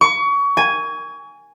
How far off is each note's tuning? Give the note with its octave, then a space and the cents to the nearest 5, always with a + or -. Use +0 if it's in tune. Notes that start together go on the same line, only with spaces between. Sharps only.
C#6 +30
G#5 -5